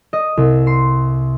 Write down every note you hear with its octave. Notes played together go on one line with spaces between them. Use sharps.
D#5
C2
C6